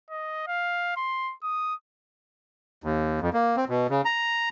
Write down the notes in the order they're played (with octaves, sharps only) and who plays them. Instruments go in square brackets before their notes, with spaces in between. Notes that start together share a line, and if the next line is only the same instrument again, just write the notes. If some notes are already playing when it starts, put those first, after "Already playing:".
[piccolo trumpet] D#5
F5
C6
D#6
[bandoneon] D#2
F2
A#3
C4
B2
C#3
A#5